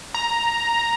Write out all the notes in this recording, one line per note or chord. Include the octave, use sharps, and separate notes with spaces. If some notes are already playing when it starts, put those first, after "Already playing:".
A#5